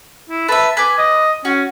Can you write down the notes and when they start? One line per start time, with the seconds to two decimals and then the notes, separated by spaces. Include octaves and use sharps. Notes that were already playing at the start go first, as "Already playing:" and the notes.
0.30 E4
0.48 B4 E5 A5
0.77 B4 G#5 D6
0.98 D#5
1.45 C#4 F#4